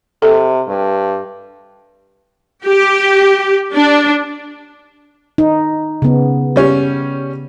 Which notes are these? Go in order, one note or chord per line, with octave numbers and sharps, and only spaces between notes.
C3 A4
G2
G4
D4
D#4
C#3 B3
G3 C#4